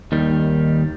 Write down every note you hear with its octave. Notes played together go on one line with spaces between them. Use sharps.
D#2 D#3 G3